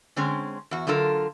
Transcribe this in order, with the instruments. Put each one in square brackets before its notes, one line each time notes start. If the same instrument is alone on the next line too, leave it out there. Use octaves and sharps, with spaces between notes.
[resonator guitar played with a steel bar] D3 G#3 C4 C#4
E2 F#4
D3 F#3 F4 A4 A#4